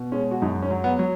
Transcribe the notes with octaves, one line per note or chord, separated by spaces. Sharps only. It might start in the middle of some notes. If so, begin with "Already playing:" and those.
Already playing: B2
G#3 C#4
F#4
F#2 D#4
C#4
F#3
B3
F#3